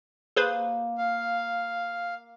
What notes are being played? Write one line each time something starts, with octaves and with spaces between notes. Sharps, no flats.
A#3 G#4 B4 C5
F5